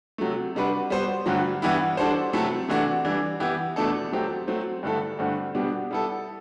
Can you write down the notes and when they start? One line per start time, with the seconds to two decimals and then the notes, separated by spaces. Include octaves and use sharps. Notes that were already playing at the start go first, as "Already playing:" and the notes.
0.18 C3 F#3 A3
0.55 C3 G3 D4 F#4 B4
0.90 G3 B3 F#4 C5
1.26 G2 D3 F#3 A3
1.62 G2 E3 B3 E4
1.97 G3 D4 F#4 A4 C5
2.33 C3 F#3 A3 E4 A4
2.68 C3 E3 A3 D4 F#4
3.05 E3 G3 D4
3.40 E3 B3 E4 G4
3.76 E2 B2 A3 D4 A4
4.12 F#3 A3 C4 G4
4.48 F#3 A3 C4
4.83 G2 D3 A3 E4 A4
5.19 G2 D3 A3 C4 F#4
5.55 B2 G3 B3 D4 G4
5.91 G3 B3 E4 A4